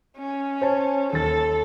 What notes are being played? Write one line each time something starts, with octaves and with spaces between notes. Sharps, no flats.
C#4
C5 C#5 A5
D#2 A4 A6